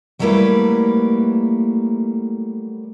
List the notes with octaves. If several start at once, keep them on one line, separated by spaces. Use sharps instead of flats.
F#3 G3 A3 A#3 E4 B4